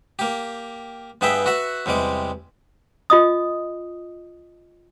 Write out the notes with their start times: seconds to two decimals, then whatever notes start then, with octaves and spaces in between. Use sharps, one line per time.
0.19 A#3 G4
1.21 G2 B3 G#4 E5 G5 B5
1.46 F#4 B4 E5 F#5
1.86 E2 C3 G3 G#3 D6
3.10 F4 D#5 D#6